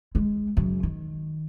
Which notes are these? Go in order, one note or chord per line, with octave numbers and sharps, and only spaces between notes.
G#3
F#2 C#3
D#3